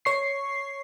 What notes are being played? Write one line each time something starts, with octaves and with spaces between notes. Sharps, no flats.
C#5 C#6 C7